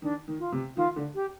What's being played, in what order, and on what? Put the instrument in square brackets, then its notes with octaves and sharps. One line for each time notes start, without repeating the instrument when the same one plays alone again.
[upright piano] D#3 [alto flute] D4
[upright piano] D#3
[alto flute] F4
[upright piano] C3
[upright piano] D#3 [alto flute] F4
[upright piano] D3
[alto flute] G4